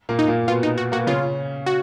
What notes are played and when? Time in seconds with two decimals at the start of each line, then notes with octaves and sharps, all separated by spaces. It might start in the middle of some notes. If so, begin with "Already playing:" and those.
0.09 A#2 A#3
0.19 D#4
0.28 A#2 A#3
0.48 B2 B3 F4
0.63 D#4
0.78 F#4
0.92 A#3 F#4
1.00 B3
1.07 C#3 C#4 F4
1.66 F#4